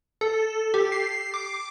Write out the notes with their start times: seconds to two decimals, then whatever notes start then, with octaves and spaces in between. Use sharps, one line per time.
0.21 A4
0.74 G4
0.92 C7
1.34 D6